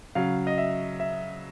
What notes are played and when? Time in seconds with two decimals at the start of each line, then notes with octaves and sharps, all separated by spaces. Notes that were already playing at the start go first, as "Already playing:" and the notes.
0.15 C#3 F#3 F5
0.47 D#5
0.58 E5
1.00 E5